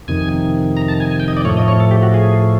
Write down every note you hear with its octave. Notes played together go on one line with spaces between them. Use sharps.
F2 C3 D#3 G#5
A#5
A5
G#5
G#5
G5
D#5
D5
A2 F3 A3 C#5
D#5
C#5
A4
G4
F#4
G#4